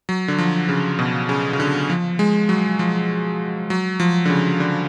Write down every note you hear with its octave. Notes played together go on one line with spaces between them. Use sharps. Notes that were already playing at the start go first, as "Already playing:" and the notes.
F#3
D3
F3
C#3
B2
C#3
C#3
D3
F3
G#3
F#3
F3
F#3
F3
D3
C#3
D3